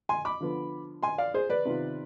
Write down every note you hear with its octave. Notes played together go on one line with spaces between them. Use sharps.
G#5 C6
B5 D6
D3 F3 B3
G#5 C6
D5 F5
G#4 C5
B4 D5
C3 D#3 B3 F4